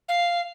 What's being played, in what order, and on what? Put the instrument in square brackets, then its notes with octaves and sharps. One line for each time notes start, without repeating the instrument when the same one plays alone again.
[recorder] F5